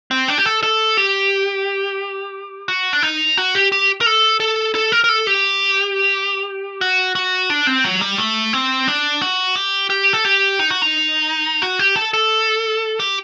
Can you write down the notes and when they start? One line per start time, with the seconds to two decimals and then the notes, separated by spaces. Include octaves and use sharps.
0.11 C4
0.28 D4
0.38 G4
0.46 A4
0.63 A4
0.97 G4
2.68 F#4
2.93 D4
3.03 D#4
3.38 F#4
3.55 G4
3.72 G4
4.01 A#4
4.06 A4
4.40 A4
4.75 A4
4.92 A#4
5.04 A#4
5.09 A4
5.27 G4
6.81 F#4
7.15 F#4
7.50 D4
7.67 C4
7.84 F#3
8.01 G3
8.18 A3
8.53 C4
8.88 D4
9.21 F#4
9.56 G4
9.90 G4
10.13 A4
10.25 G4
10.59 D#4
10.71 F#4
10.82 D#4
11.62 F#4
11.79 G4
11.96 A4
12.13 A4
13.00 G4